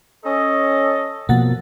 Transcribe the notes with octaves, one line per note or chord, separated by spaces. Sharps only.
C#4 A4 D#5
B2 F3 A#3 F#5 A6